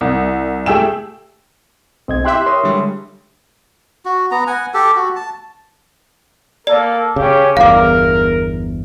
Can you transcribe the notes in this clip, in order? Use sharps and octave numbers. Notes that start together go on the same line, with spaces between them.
C2
A3 G4 G#4 G5 E6 E7
B1 C4 D#5 G#6
E4 G4 E5 G5 C6 F#6
A#4 C#5 C6 D#6
D3 G3 G#3
F#4
B3 A#5
F#5 G#5
G4 A4
F#4
A5
A#3 A4 A#4 D5
C#3 C#4 G4
G1 E2 A#4 F5 D6